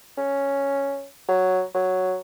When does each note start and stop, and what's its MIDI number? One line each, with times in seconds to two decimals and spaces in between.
0.18 1.05 61
1.28 1.62 54
1.75 2.17 54